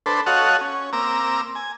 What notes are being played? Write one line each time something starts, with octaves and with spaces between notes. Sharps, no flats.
D4 A4 B4 C5
F#4 A4 C#5 D#5 F5 F#5
C#4
A#3 C4 A#5 D6 E6
G#5